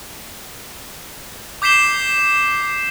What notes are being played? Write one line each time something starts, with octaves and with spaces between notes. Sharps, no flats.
D6 G6 B6 C7 E7 G7